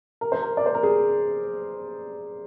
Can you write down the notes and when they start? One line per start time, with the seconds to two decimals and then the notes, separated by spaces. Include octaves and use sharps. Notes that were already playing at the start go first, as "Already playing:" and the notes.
0.21 A#4
0.32 C5
0.42 A#4
0.57 D5
0.66 C5
0.74 A#4
0.83 G#4